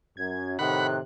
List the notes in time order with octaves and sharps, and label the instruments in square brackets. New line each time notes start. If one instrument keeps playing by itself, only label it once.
[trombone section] F#2 [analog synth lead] G#6
[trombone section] A2 C3 [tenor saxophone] D#3 [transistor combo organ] F#5 B5 [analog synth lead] F#6